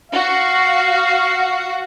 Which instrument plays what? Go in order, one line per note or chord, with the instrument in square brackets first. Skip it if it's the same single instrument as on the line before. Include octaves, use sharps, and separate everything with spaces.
[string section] F#4 [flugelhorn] F5